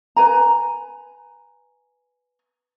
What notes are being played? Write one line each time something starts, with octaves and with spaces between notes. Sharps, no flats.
B4 G#5 A#5